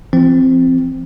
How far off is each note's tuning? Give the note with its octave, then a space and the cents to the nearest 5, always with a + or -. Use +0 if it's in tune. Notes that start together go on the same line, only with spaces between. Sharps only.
F3 -40 C4 +0